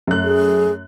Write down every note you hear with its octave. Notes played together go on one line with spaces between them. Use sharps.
F#2 A3 F#6
G#4